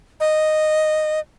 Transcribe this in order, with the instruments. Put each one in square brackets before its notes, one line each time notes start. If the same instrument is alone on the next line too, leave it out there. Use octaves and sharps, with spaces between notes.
[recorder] D#5